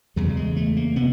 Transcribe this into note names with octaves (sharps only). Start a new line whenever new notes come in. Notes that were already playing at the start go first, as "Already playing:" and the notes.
E2 C#3 G3
G3
G#3
A3
A#3
C3 B3